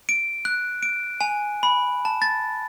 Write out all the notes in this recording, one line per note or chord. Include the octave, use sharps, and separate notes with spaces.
D7
F#6
D7
G#5
B5
A5
A6